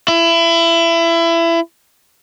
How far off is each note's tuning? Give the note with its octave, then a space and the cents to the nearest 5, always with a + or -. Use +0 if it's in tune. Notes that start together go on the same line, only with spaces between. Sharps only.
E4 +25